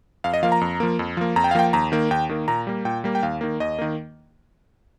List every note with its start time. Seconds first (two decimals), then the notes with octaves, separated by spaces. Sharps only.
0.24 F2 F5
0.33 D#5
0.43 F3 A#3 F5
0.52 A#5
0.61 F2
0.80 F3 A#3
0.99 F2
1.17 F3 A#3
1.36 F2 A#5
1.44 G5
1.51 F5
1.55 F3 A#3 G5
1.73 D#2 A#5
1.92 D#3 A#3
2.11 D#2 G5
2.29 D#3 A#3
2.48 A#2 A#5
2.67 G3 A#3
2.85 A#2 G5
3.04 G3 A#3
3.15 G5
3.23 D#2 F5
3.41 D#3 A#3
3.60 D#2 D#5
3.79 D#3 A#3